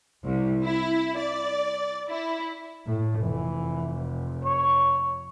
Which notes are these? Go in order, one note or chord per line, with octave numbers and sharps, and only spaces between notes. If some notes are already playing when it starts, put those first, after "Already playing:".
C2
E4
D5
E4
A2
F1 E3
C#5